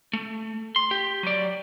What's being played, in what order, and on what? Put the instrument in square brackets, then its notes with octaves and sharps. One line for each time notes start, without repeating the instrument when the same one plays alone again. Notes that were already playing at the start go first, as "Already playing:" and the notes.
[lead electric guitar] A3
C6
G4
F#3 D5